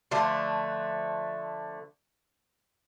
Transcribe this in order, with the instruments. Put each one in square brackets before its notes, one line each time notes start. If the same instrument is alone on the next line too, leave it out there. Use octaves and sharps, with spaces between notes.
[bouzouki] D3 F3 A3 B4